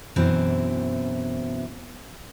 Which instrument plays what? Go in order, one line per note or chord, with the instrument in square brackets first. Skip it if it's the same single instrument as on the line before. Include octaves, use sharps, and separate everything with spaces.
[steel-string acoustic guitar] F#2 B2 E3 C4 D4